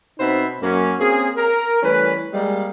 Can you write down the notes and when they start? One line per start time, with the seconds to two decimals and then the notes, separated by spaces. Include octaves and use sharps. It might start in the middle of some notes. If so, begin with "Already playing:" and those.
0.19 B2 C4 D#4 C5 E5 B5
0.62 F#2 A#3 C#4
0.99 A#3 C4 C#4 G#4
1.36 A#4
1.82 E3 G3 A3 C#4 B4
2.33 G3 G#3 A#3